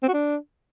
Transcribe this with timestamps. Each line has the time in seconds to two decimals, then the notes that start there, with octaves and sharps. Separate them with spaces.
0.03 C4
0.08 F#4
0.14 D4